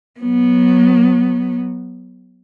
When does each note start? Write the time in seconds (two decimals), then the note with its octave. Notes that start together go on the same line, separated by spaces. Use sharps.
0.20 F#3 B3